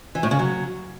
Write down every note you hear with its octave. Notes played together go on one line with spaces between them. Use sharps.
E3
A2
C#3
F#3